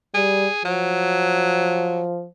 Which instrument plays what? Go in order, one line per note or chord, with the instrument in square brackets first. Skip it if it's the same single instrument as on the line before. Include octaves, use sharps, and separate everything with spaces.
[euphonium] G3 [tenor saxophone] G#4
[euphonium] F3 [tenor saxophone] F#3